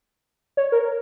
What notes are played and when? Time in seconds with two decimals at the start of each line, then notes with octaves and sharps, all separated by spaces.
0.57 C#5
0.72 A#4